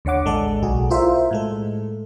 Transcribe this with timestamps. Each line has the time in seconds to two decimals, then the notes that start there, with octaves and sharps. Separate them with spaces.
0.05 D#2 D3 C#5 F#5 D6
0.25 A1 G#3 A4 D5
0.62 B1 F#4 G#4
0.90 E4 F4 A#4 C5 E5
1.31 A2 G#3 A4